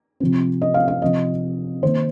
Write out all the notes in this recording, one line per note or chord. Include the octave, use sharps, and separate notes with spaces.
C3 F3 C4
D#5
F5
F5
C3 F3 C4 D#5
D#3 A#3 C5